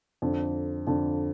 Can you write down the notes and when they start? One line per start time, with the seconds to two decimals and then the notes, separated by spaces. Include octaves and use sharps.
0.22 F2 D3
0.87 F2 D3